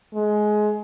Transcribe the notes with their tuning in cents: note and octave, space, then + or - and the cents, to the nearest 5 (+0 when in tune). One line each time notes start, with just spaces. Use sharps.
G#3 +20